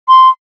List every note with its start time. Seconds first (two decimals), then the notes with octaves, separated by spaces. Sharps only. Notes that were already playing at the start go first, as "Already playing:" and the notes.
0.08 C6